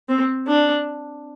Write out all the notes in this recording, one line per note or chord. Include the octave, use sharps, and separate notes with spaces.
C4
D4